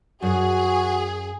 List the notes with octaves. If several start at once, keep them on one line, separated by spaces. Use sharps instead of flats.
F#2 F#4 G#4